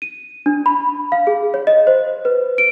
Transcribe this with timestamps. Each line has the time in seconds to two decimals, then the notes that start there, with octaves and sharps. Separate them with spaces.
0.02 D#7
0.46 D4
0.66 B5
1.12 F5
1.27 G#4
1.54 C#5
1.67 D#5
1.87 C5
2.25 B4
2.58 D7